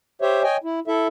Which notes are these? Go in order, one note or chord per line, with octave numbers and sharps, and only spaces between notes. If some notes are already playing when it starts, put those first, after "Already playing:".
G4 C5 C#5 E5
C#5 D#5 G5 G#5
E4
E4 A4 E5